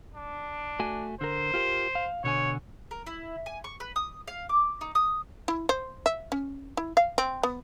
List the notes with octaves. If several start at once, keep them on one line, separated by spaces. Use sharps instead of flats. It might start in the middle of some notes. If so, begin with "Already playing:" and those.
D4
A3 F#4 G#5
D3 A#4 C5
F4 G4 A#4
F5
B2 D3 C#5 G#5
A#4
E4
G#5
C#6
B4
D#6
F5
D6
D#4
D#6
E4
C5
E5
C#4
E4
F5
C4
B3